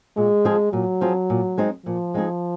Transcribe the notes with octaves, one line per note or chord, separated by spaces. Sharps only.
A#2 G#3
F3 C4 F4 G#4
A#2 F#3
F3 C4 F4 G#4
A#2
G#3 C4 D#4 G#4
A#2 F3
G#3 C4 D#4 G#4